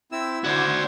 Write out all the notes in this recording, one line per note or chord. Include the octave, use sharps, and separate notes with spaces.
C4 E4 E6
D3 F#4 C5 D5 G#6